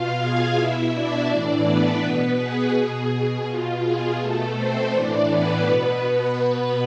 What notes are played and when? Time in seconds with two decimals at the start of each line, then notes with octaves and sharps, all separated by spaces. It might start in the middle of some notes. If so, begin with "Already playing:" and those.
Already playing: B2 F4 F5
0.21 G#4 G#5
0.57 B2 E4 E5
0.93 D4 D5
1.30 A2 E3
1.66 B3 B4
2.02 B2
2.39 G#4
2.75 B2 G#4
3.12 G#4
3.47 B2 F4
3.84 G#4
4.20 B2 A3 A4
4.56 C4 C5
4.93 A2 E3 D4 D5
5.30 B3 B4
5.65 B2 B3 B4
6.38 B2 B3 B4